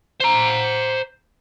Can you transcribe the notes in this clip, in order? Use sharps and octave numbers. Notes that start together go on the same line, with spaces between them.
C5 A#5